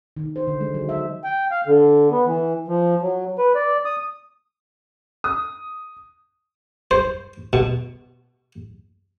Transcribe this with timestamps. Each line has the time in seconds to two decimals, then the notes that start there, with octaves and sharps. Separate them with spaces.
0.17 D#3
0.36 C5
0.47 D3
0.60 G#3
0.74 F#3
0.89 E5
1.24 G5
1.51 F5
1.67 D3
2.11 B3
2.26 E3
2.68 F3
3.02 F#3
3.38 B4
3.55 D5
3.85 D#6
5.24 D#6
6.91 C5
7.53 B2